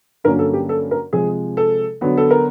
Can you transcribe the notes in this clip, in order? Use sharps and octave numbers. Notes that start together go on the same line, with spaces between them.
G2 D3 F#3 A#3 C#4 A#4
A4
G4
A4
A#4
C3 F3 G#3 G#4
A4
D3 F#3 B3
A4
A#4